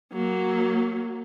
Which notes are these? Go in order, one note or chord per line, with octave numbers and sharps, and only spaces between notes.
F#3 A#3